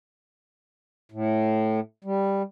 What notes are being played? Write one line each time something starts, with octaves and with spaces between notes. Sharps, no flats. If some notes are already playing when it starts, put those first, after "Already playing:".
A2
G3